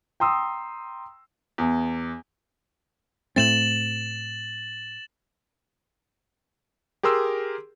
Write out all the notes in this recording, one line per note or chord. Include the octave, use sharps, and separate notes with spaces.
G5 A#5 C6 D#6 E6
E2
A2 A3 C4 A6 E7 F#7
G4 G#4 A#4 C6 E6